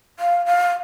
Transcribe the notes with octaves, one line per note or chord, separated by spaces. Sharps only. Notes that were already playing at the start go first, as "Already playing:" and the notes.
F5
F5